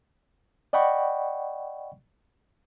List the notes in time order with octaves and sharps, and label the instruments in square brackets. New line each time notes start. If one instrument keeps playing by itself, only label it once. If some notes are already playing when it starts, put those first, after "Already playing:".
[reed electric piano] D5 D#5 F#5 G5 B5 C#6